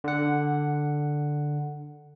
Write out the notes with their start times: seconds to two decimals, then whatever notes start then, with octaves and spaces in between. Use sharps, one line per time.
0.04 D3 F#5